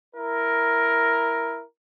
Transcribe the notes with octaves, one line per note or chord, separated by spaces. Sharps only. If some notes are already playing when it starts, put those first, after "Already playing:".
E4 A#4